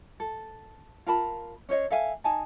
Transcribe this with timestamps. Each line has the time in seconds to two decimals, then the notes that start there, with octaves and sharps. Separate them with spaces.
0.20 A4
1.06 F4 A#4 A5 B5
1.69 C#4 C5 C#5 D#5
1.90 A4 E5 F5 G#5
2.24 D#4 G#5 A5